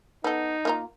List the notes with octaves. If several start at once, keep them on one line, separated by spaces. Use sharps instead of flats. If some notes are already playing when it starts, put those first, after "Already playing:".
B3 D#4 A4
A#3 F4 A#5